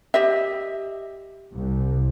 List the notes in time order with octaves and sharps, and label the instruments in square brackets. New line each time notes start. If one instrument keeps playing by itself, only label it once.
[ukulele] G4 D#5 E5
[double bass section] C2